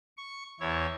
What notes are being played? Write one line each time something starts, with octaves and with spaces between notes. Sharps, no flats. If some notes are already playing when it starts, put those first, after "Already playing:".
C#6
E2 E4 C#5